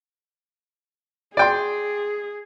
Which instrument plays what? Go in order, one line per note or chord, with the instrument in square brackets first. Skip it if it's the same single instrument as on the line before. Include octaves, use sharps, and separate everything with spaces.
[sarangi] G#4 [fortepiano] D5 G5 C6